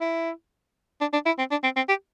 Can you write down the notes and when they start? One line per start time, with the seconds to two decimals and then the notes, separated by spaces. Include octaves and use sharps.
0.01 E4
1.01 D4
1.13 D4
1.26 E4
1.38 C4
1.51 D4
1.64 C4
1.76 C4
1.89 G4